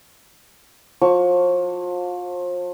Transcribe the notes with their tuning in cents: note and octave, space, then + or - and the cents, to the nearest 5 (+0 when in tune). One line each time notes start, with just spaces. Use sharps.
F3 +35 C#6 +25